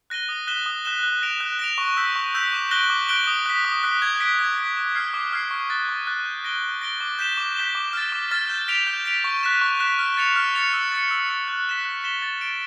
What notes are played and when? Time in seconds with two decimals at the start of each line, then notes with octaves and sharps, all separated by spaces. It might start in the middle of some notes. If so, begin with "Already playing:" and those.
0.10 F#6 A#6 D#7 G7
0.29 D#6
0.47 F#6 B6 E7 G7
0.66 D#6
0.85 F#6 B6 E7 G7
1.03 F#6
1.22 A#6 D7 F7
1.41 F#6
1.59 A#6 D7 F7
1.78 C#6
1.97 E6 G6 B6
2.16 C#6
2.34 E6 G6 B6
2.53 D6
2.71 F#6 A#6 D7 G7
2.90 D6
3.09 F#6 A#6 D7 G7
3.27 D#6
3.46 F#6 B6
3.65 D#6
3.83 F#6 B6
4.02 G#6
4.20 B6 D7
4.39 G#6
4.58 B6 D7
4.76 D6
4.95 F6 G#6 C7
5.14 D6
5.32 F6 G#6 C7
5.51 C#6
5.70 F#6 A6
5.88 C#6
6.07 F#6 A6
6.25 G6
6.44 A#6 D7 G7
6.63 G6
6.82 A#6 D7 G7
7.00 D6
7.19 G6 B6 E7 G7
7.37 D6
7.56 G6 B6 E7 G7
7.75 D6
7.93 F6 A6
8.12 D6
8.31 F6 A6
8.50 G6
8.68 B6 D7 F7
8.87 G6
9.05 B6 D7 F7
9.24 C#6
9.43 F#6 B6 E7
9.61 C#6
9.80 F#6 B6 E7
9.99 F6
10.17 A6 C#7 F7
10.36 F6
10.55 A6 C#7 F7
10.73 E6
10.92 A6 C#7
11.11 E6
11.29 A6 C#7
11.48 F#6
11.67 B6 E7 G7
11.85 F#6
12.04 B6 E7 G7
12.22 A6
12.41 D7 G7